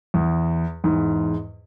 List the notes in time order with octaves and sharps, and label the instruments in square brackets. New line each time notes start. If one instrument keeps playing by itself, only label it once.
[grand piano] E2
E2 G#2